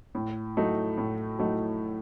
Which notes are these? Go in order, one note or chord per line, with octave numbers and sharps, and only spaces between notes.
A2
F#3 A3 D#4
A2
F#3 A3 D#4